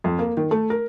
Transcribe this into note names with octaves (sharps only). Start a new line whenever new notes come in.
F2
A#3
D#3
A3
A#4